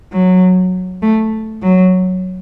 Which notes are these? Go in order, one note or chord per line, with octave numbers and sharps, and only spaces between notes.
F#3
A3
F#3